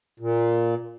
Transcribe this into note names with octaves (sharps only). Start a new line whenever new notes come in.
A#2